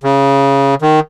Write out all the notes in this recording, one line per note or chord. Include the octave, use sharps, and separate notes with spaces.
C#3
D#3